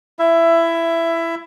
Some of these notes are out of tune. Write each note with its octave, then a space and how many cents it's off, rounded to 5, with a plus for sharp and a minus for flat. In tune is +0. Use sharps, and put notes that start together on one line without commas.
E4 +15 E5 +15